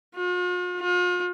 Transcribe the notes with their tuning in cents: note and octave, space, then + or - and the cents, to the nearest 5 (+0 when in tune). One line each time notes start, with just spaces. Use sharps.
F4 +45
F4 +40